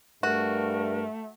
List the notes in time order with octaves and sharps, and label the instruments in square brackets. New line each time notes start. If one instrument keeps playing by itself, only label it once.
[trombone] G2 [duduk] A3 [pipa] F#4 [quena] A#4